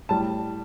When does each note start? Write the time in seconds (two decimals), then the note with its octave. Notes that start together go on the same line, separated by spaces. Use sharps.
0.09 A2 G3 A5